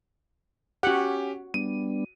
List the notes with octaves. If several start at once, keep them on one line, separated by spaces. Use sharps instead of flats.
C#4 F#4 G4 F#5
G3 B3 D4 D#7